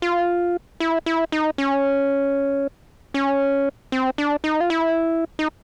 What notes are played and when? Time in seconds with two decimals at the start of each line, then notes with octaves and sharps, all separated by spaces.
0.02 F4
0.80 E4
1.06 E4
1.32 D#4
1.58 C#4
3.14 C#4
3.92 C4
4.18 D4
4.44 D#4
4.60 F4
4.70 E4
5.39 D#4